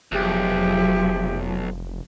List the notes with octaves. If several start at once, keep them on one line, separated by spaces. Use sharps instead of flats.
F1 B1 F3 F#3 G4 G#4 E5